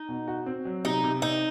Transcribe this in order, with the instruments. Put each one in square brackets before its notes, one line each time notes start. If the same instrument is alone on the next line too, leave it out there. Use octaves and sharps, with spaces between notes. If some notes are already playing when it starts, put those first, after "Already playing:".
Already playing: [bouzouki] D#4
[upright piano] B2
F#4
C4
F#3
[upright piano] C3 [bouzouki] D#4
[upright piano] C3
[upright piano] C4 [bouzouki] D#4